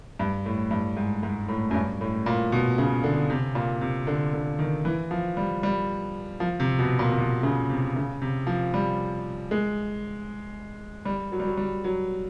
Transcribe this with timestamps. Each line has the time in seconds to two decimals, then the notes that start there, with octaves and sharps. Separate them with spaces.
0.19 G2
0.46 A2
0.71 G2
0.97 G#2
1.23 G#2
1.49 A2
1.71 F#2
1.74 G2
2.01 A2
2.26 A#2
2.52 B2
2.78 C#3
3.04 D3
3.30 C3
3.55 A#2
3.81 C3
4.07 D3
4.34 D3
4.59 D#3
4.85 E3
5.11 F3
5.37 G3
5.63 G3
6.40 F3
6.60 C3
6.79 B2
6.99 A#2
7.11 C3
7.17 B2
7.43 C#3
7.70 C3
7.96 C#3
8.22 C3
8.47 F3
8.74 G3
9.51 G#3
11.05 G3
11.32 F#3
11.40 G3
11.47 F#3
11.57 G3
11.84 F#3